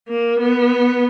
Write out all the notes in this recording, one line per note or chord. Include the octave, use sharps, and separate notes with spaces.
A#3
B3